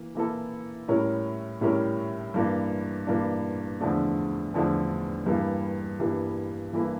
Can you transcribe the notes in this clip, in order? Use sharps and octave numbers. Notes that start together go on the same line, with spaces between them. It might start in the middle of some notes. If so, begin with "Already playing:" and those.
Already playing: E3 A#3
E3 A#3 E4 A4
A2 G3 C#4 E4 A#4
A2 G3 C#4 E4 A#4
G2 E3 A#3 D4
G2 E3 A#3 D4
E2 D3 F3 A3 D4
E2 D3 F3 A3 D4
G2 E3 G3 A#3
G2 E3 G3 A#3
G2 E3 A#3 E4 A4